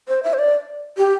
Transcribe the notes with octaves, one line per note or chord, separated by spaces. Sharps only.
C5
E5
C5
D5
G4